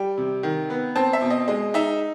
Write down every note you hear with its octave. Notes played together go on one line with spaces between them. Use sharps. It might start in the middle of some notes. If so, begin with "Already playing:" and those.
Already playing: G3 G5
C3
D#3
B3
C4 A5
E5
B2
D#5
G#3 D#5
D#4 E5